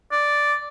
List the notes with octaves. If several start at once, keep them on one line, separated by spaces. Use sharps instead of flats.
D5